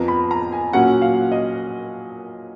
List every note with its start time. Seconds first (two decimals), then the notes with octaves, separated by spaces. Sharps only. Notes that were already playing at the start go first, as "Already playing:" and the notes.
Already playing: F2 F3 B3 A#5
0.08 B5
0.31 A#5
0.52 G#5
0.73 A#2 F#3 C#4 F#5
1.02 F5
1.32 D#5